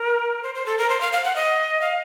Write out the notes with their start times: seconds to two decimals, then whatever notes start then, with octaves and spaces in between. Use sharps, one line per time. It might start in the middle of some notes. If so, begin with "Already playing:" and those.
Already playing: A#4
0.43 C5
0.55 C5
0.66 A4
0.78 A#4
0.89 C5
1.01 F5
1.13 F5
1.24 F#5
1.36 D#5
1.81 F5